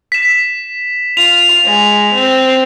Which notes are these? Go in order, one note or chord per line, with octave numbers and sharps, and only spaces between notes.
B6 E7
F4 F7
G#3
C4